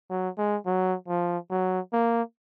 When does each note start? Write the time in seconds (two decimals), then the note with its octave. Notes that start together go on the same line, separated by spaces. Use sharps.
0.10 F#3
0.38 G#3
0.66 F#3
1.08 F3
1.51 F#3
1.93 A#3